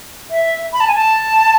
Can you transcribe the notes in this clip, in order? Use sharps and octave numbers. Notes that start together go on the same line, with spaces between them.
E5
B5
A5
G#5
A5